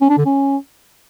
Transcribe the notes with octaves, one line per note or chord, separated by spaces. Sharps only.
C#4
D4
D3
C#4